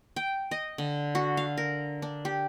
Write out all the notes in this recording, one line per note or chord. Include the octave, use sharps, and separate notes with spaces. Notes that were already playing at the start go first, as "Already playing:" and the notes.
G5
D#5
D3
F#4
F5
A#4
D4
G4